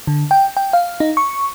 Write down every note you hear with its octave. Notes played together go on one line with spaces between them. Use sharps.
D3
G5
G5
F5
D#4
C#6